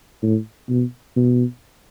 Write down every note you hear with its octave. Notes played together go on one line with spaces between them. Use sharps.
A2
B2
B2